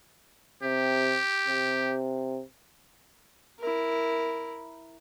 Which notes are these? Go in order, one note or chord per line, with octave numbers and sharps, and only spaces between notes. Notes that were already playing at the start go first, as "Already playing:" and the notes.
C3 G4
C3
E4 A#4